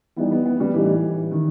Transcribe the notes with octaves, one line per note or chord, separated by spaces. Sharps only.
E3 G3 B3 D#4 G4
B3
B3
G3
A2 E3 G3 D#4 G4
D#3